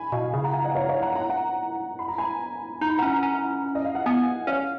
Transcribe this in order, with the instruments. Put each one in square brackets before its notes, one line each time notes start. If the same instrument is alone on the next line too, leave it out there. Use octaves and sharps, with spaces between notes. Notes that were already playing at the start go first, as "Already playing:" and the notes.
Already playing: [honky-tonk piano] G#5 B5
[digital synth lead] B2 [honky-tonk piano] F5 G#5
[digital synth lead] C#3 [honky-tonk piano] F5 G#5
[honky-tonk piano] F#5 A#5
F5 G#5
D#5 F#5
C#5 F5
C#5 F5
F#5 A#5
F#5 A#5
F#5 A#5
B5
A#5
G#5 B5
[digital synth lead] D#4 [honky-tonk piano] A#5
[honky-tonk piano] B5
[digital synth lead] C#4 [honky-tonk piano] F#5 A#5
[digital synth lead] C#4
[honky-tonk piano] D#5
F5
F#5
[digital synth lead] B3 [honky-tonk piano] F5 G#5
[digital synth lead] C#4 [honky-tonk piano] C#5 F5